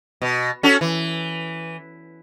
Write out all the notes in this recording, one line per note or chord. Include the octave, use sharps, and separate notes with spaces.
B2
C#4 F#4 A4
E3